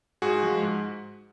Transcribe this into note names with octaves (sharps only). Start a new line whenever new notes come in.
G#2 F#4 G#4
F3 G#3
G#2